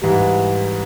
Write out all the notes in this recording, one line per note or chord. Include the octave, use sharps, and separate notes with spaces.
G#2 E3 G3